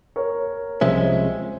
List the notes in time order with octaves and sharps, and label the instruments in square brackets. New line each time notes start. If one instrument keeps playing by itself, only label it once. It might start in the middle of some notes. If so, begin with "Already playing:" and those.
[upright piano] A#4 C#5
[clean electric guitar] C2 C3 F3 G#3 C#4 [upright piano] C5 E5